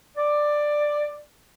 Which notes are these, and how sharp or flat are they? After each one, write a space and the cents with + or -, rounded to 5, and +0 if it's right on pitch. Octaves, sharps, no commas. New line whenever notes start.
D5 +10